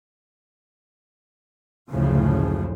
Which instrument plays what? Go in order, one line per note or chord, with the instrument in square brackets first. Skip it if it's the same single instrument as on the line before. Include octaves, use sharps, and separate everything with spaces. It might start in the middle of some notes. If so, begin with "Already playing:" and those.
[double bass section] F#1 D2 A2 C#3 F3